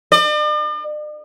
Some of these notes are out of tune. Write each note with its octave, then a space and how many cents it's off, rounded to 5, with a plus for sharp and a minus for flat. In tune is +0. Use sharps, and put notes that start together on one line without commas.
D5 +45